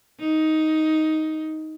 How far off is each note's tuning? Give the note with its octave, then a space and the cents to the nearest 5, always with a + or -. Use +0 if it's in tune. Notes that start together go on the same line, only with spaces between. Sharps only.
D#4 +10